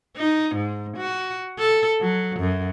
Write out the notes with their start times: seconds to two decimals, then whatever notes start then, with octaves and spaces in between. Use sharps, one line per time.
0.17 D#4
0.55 G#2
0.97 F#4
1.58 A4
2.01 F#3
2.40 F#2